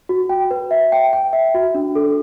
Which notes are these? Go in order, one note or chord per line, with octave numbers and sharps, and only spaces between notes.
F#4
G5
B4
E5
G5
G5
E5
F#4
D4
A4